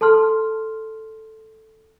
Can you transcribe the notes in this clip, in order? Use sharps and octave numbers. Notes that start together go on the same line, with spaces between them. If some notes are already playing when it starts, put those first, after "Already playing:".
A4 A5 C6 F6